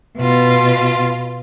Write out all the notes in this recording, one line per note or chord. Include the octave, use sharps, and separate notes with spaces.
B2 F4